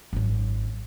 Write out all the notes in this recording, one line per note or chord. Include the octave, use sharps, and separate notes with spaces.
G#1 F#2